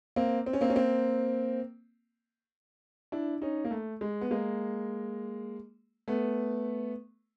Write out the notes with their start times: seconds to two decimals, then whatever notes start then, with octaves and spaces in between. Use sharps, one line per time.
0.16 A#3 C4
0.46 C4
0.53 C#4
0.61 A#3 C4
0.70 C#4
0.75 A#3 C4
3.12 D4 E4
3.42 C#4 D#4
3.65 A#3
3.71 A3
4.01 G#3
4.21 B3
4.31 G#3 A#3
6.08 A3 B3